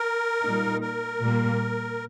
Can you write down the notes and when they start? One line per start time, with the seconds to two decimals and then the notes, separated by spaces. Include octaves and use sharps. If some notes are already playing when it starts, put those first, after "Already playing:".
Already playing: A#4
0.43 A#2 G3 A#3 D#4
0.81 A#4
1.21 A#2 G3 A#3